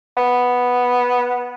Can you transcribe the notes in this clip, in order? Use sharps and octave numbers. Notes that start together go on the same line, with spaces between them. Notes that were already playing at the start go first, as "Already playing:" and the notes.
B3